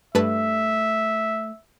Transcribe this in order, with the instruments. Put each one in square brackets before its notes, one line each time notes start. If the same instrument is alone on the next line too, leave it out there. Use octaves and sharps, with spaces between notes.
[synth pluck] G2 B4 A5 [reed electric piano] A3 [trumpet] E5